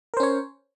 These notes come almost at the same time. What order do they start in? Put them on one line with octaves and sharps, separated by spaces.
A#4 C5 C#4 C#5